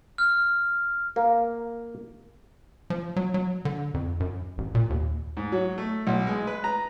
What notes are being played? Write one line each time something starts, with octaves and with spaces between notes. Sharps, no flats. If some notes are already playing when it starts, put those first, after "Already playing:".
F6
A#3
F3
F#3
F#3
D3
F2
F#2
A1
A#2
D#2
G#2
F#3
A3
B1
G#3
B4
A#5